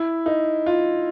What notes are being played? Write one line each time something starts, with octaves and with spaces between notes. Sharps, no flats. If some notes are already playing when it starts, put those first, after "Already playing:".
Already playing: E4
D#4
F4